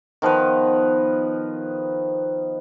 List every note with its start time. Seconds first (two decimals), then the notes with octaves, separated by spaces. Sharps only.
0.22 D#3 F3 B3 B4